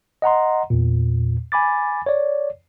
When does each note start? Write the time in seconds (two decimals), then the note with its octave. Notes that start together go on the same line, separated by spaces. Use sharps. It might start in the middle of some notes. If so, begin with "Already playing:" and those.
0.22 D#5 F#5 A#5 C6
0.70 E2 A#2
1.52 G#5 B5 D6 A6
2.06 C#5 D5